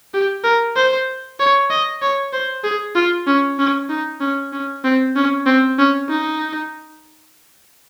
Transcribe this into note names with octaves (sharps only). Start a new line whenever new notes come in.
G4
A#4
C5
C#5
D#5
C#5
C5
G#4
F4
C#4
C#4
D#4
C#4
C#4
C4
C#4
C4
C#4
D#4